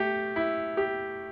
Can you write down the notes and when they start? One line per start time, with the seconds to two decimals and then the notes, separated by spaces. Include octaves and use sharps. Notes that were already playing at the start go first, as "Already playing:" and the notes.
Already playing: A3 G4
0.36 E4
0.77 G4